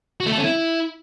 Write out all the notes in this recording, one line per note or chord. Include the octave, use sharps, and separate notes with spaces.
F#4
A3
A4
C#4
E4